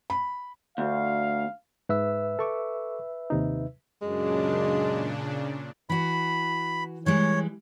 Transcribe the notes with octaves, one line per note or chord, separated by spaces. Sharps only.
B5
D2 F5
G#2 B4 E5 E6
A4 C#6 D6
D#2 C3 D#4
F#2 A#2 C#3 G#3 D4
E3 F#4 B5
E3 G3 G#3 C#5